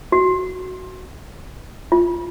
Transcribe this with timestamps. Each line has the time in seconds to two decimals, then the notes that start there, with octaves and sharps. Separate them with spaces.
0.12 F#4
1.92 F4